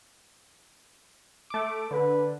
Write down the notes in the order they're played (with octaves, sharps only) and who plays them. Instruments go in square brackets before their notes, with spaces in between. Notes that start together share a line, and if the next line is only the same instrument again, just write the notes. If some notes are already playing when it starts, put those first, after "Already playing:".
[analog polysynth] A3 D6
[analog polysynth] D3 [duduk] B4